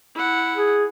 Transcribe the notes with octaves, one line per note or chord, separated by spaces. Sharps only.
E4 F#5
G#4